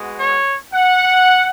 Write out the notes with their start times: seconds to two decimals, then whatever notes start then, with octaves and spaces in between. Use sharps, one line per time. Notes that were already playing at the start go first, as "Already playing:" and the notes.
Already playing: G#3 B3 F#4
0.17 C#5
0.74 F#5